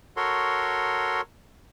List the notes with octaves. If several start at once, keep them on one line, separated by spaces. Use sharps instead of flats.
F#4 A4 A#4 C#5 C6